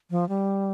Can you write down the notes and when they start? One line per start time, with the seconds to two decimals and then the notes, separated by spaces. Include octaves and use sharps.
0.11 F3
0.29 G3